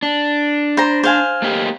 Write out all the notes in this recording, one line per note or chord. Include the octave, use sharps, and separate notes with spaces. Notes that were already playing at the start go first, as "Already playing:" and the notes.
D4
C5 A#5
C5 F5 G#5
A3 A#3 G4